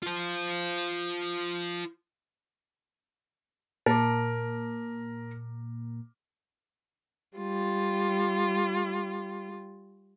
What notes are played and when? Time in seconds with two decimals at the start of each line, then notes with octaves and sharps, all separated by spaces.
0.03 F4 C5
3.86 A#2 A#3 A#4 A5 D6
7.38 G3 F4